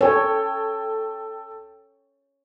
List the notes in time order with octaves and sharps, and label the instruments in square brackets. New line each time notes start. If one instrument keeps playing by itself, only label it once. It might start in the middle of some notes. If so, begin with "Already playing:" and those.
[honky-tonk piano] A4 G5 [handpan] C#5